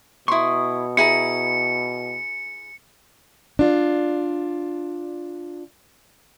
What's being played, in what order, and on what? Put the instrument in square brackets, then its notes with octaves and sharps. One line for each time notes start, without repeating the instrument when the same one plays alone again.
[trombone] B2 [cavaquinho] E4 C6 [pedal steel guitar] C#6 D#6
[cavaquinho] E4 G#4 A#5 [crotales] C#7
[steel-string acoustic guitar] D4 F4